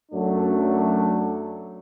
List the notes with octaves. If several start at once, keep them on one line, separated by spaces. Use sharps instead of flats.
F#2 F#3 A3 D4